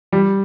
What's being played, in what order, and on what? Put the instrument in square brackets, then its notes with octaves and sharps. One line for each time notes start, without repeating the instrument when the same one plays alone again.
[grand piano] G3